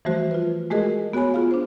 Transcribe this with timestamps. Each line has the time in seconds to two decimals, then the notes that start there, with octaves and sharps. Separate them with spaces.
0.05 E3 F3 G3 A3 F#4 C5
0.31 F4 B4
0.70 G#3 A3 F#4 G#4 A#4 D#5
1.13 B3 F#4 C#5 G#5 B5
1.34 F4 G#4 F5
1.51 D4 C5